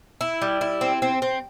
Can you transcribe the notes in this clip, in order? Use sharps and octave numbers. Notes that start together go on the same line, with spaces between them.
E4
G3
E4
C4
C4
C4